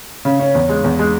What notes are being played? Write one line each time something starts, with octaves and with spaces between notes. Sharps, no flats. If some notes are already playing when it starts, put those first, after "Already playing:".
C#3
C#4
E2
G#3
E2
G#3